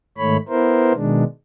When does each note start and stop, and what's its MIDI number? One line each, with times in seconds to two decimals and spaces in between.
0.18 0.37 44
0.18 0.37 51
0.18 0.37 57
0.18 0.37 73
0.18 0.37 83
0.49 0.93 59
0.49 0.93 64
0.49 0.93 70
0.49 0.93 72
0.94 1.24 47
0.94 1.24 51
0.94 1.24 56
0.94 1.24 62